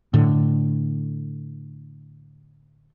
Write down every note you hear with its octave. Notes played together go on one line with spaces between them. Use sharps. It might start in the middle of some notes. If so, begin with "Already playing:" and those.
A2 D3